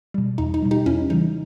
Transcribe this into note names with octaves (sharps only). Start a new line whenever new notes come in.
B2 G3
E2 D#4
D#4
B2 G3
D#4 G4
E2 C#4 E4
C#3 E3 G3 D#4